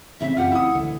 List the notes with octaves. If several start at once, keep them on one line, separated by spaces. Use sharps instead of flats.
A1 C#3 C4 E5
F#2 F4 G4 F#5
F1 E4 D#6
E1 D2 D3